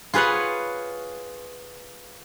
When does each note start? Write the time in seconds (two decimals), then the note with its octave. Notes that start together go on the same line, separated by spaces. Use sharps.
0.14 F4 G#4 B4 C#5 F#5